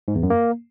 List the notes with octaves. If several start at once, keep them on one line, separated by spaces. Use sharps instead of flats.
G#2
E2
F#2
A#3